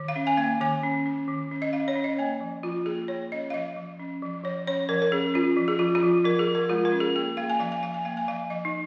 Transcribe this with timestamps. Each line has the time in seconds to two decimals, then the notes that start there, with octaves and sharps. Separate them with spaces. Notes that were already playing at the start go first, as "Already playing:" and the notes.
Already playing: D#3
0.08 F5
0.16 C#4
0.27 G#5
0.37 A#3 F5
0.60 D#3 G#5
0.83 C#4
1.06 C#4
1.28 D#3
1.51 C#4
1.62 D#5
1.73 C#4 F5
1.88 C#5
1.96 C#4
2.04 D#5
2.18 A#3 G#5
2.40 F3
2.63 F3 F4
2.86 A#3 G#4
3.08 A#3 C#5
3.32 C#4 D#5
3.50 F5
3.54 F3 D#5
3.77 F3
4.00 C#4
4.22 F3
4.44 F3 C#5
4.67 C#4 C#5
4.89 F3 A#4
5.02 A#4
5.12 C#4 G#4
5.34 C#4 F4
5.57 F3
5.68 G#4
5.79 F3 F4
5.95 F4
6.03 F3
6.24 F3 A#4
6.39 G#4
6.47 F3
6.55 A#4
6.69 G#3 F4
6.85 A#4
6.92 C#4
7.00 G#4
7.15 A#3 G#4
7.37 A#3 F5
7.50 G#5
7.60 F3 F5
7.72 G#5
7.83 F3 F5
7.94 G#5
8.05 A#3 F5
8.17 G#5
8.28 F3 F5
8.50 F3 D#5
8.65 D#4